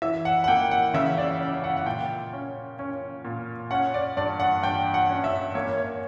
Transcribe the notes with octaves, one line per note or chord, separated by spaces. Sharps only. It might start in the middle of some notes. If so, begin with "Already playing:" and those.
E3 E5
F#5
F#5
A#3 G5
F#5
C#3 E5
D5
C#4
F#5
F#5
A#2 G5
C#4
C#4
A#2
C#4 F#5
D5
G2 D5
F#5
G2 G5
F#5
C#4
E5
A#3 C#5
C#5